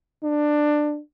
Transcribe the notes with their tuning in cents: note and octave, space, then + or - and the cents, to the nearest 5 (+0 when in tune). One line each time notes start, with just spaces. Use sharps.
D4 +15